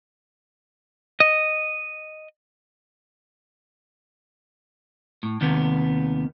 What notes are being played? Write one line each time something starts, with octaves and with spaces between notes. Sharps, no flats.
D#5
A2
D#2 C3 D#3 B3